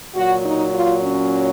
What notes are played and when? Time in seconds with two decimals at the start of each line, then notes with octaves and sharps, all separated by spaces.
0.15 A#2 F#3 F#4
0.43 D#4
0.72 F4
1.01 C#4